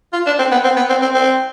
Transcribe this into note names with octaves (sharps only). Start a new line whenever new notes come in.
F4
D4
C4
B3
C4
B3
C4
C4
C4